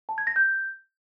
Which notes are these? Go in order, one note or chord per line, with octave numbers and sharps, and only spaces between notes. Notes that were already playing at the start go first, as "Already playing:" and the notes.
A5
G#6
A#6
G6